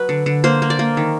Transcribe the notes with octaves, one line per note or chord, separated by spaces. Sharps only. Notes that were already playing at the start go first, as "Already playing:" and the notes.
Already playing: F#3 B4
D3
D3
A#3 C5
A#3
D5
A#3
D#3